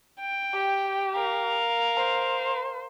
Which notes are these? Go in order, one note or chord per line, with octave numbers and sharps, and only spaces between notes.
G5
G4
A#4 F5
C5